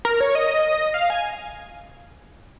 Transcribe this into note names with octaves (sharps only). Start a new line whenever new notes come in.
A#4
C#5
D#5
F5
G#5